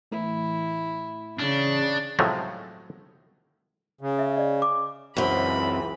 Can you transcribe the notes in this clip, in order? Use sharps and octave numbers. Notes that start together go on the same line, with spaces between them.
A2 E3 E4
C#3 D4
A2 C3 F3 F#3 G#3 A3
C#3
E5
D5 D#5
D6
C#2 F#2 E3 C4 B5